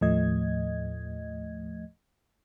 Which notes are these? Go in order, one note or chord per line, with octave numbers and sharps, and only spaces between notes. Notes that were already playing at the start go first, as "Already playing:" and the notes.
D#2 A2 F3 A3 D#5 G#6